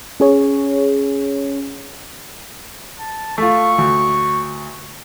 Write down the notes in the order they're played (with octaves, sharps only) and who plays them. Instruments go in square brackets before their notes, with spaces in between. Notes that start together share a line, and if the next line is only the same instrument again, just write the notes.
[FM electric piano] C#4 G#4 C#5
[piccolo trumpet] A5
[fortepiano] A3 F4 [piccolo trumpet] C#6
[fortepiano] D2